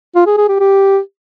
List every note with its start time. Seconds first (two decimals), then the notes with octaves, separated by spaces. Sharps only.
0.15 F4
0.26 G#4
0.37 G#4
0.49 G4
0.60 G4